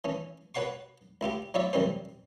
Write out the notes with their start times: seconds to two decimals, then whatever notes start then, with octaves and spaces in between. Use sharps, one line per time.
0.04 E3 C#4
0.55 F#4 B4 C#5 F#5 C6 C#6
1.21 C#2 E4 F4 G4
1.54 F#3 E4 F4 C#5 D5 E5
1.73 C2 F#2 E3 G3 C#4 C5